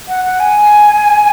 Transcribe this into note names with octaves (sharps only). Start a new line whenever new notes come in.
F#5
F#5
G#5